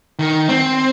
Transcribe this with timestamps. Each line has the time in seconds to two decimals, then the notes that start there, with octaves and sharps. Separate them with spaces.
0.20 D#3
0.49 C4